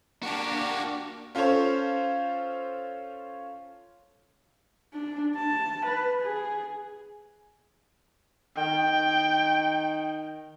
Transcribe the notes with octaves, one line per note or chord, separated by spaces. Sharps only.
A#3 D4 F#4 G4
C#4 F4 A4 C5 C#5
D4
A5
B4
G#4
D#3 G5